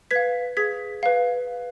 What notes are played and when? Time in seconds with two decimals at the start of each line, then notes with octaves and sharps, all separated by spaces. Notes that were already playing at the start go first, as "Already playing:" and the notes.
0.11 B4 F5 G#6 B6
0.57 G#4 G#6 B6
1.03 B4 F5